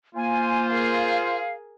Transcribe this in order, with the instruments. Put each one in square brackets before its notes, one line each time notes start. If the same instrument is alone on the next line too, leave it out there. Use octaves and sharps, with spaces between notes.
[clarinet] A#3 [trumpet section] F4 C5 [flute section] G#5
[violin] G#4 A#4 [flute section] F5